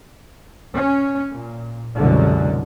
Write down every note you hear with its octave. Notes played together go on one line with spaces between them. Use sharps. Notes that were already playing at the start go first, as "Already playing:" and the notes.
C#4
A#2
C2 F#2 B2 D3 G#3